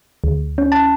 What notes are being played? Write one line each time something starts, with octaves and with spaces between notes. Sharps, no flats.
D2
C#4
A5